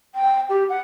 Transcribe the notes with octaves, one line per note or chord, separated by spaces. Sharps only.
G5
G4
F#5